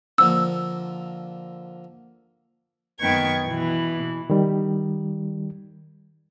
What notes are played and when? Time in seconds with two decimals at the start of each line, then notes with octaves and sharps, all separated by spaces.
0.18 D3 F3 A#3 E6
2.99 F#2 D#3 B3 G5 C#6 G#6
3.45 B2 E3
4.30 D#3 G3